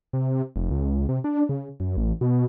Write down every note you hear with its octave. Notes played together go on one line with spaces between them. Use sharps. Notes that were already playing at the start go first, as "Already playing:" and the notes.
C3
F1
C#2
C3
D4
C#3
F#2
A1
B2